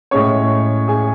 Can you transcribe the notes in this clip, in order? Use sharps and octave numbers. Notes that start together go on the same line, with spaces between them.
A2 G#3 C#4 C#5 C#6
G#4 G#5